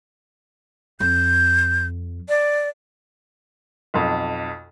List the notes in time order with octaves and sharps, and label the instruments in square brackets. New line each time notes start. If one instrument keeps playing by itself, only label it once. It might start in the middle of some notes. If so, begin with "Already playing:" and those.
[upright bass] F2 [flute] G6
[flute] D5
[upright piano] B1 F2